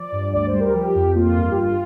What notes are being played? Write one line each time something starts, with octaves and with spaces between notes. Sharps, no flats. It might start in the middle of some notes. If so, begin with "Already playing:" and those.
Already playing: F3 D5
G2
D2 D5
C5
G3
A#4
F3 G4
F2
A#3 F4
G2
G4
G1 F4